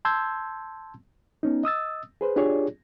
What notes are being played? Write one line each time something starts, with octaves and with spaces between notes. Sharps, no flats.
A5 C6 E6 G6 G#6
B3 C#4 D#4
D#5 D#6 E6 A6
G#4 B4 C5
D4 F4 G4 G#4 C#5 D5